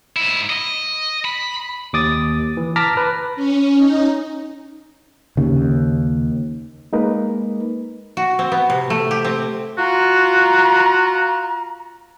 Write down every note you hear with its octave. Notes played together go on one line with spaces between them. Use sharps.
G#2 E4
D#5
B5
D#2 D6 D#6 A6
E3
A5 A#5 D6 F6 A#6 B6
B4
C#4
D#4
D#2 C#3
G#3 A#3 D#4 A#4 B4
F#4
C4
B3
C3
A3
G4
C4
F4 F#4 A#5